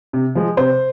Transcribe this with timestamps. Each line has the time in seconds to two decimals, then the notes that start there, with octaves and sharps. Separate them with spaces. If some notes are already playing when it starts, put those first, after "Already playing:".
0.13 C3
0.35 F3 G#3
0.57 C3 C5